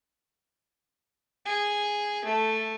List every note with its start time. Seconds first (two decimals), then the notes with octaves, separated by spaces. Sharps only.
1.46 G#4
2.25 A3